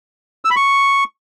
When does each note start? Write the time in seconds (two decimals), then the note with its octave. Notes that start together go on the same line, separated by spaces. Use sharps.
0.45 E6
0.50 B5
0.56 C#6